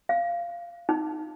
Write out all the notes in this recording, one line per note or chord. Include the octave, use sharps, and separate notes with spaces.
F5
D#4